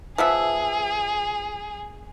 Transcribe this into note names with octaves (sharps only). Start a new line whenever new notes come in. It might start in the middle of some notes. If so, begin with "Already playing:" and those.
F3 B3 G#4 E5